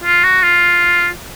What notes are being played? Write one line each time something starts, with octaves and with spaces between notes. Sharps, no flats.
F4
F#4
F4